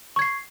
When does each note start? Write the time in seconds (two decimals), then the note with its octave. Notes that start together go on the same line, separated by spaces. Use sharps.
0.16 C#6
0.19 G#6
0.22 C7